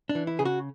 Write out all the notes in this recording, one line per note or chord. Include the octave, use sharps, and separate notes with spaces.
D4
E3
E4
C#3 G#4
F#4